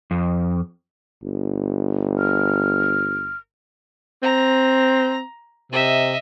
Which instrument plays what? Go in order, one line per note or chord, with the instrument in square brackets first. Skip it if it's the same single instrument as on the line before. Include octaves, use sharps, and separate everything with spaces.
[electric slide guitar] F2
[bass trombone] G1
[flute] F6
[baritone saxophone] C4 [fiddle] A#5
[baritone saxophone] C3 [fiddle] D#5 E5